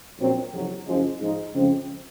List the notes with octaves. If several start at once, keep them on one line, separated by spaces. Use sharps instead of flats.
A#1 A#2 F#3 C4
F#1 F2 C3 F#3
F#1 F#2 C#3 F3 G#3
G#2 F3 G#3 D#4
F2 C#3 F3 G#3 C4